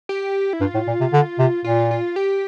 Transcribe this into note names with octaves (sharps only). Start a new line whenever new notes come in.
G4
E4
G2 F4
A2
A#2
C3
D3
C3
A#2 F4
F4
G4